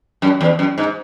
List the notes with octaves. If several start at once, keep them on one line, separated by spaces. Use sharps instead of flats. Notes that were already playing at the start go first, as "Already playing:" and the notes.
F#2
E2
F#2
G#2